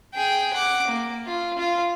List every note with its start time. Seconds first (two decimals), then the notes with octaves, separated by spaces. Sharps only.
0.14 G#4 G5
0.53 F#5 D6
0.88 A#3
1.26 F4
1.58 F4